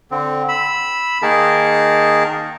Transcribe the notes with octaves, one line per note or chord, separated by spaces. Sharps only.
D3 C4
B5 E6
D#3 A#3 D#4 G#4 A#4 A5